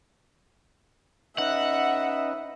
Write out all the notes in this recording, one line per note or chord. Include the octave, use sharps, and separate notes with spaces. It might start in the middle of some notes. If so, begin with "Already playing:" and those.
C#4 D#4 B4 D#5 E5 F#5